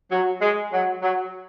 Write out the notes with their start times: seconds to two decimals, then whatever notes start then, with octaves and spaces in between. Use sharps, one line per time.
0.12 F#3
0.41 G#3
0.73 F#3
1.02 F#3